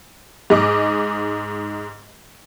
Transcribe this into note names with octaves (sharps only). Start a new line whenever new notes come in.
G#2 D#5 D6